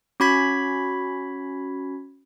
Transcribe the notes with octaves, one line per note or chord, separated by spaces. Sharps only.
C#4 F#4 B5 G#6 B6